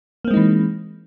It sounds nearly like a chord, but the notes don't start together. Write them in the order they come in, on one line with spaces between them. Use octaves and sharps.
A#3 C4 G#3 D#4 E3